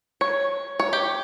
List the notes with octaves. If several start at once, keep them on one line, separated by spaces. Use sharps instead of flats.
C#5
C#5
G4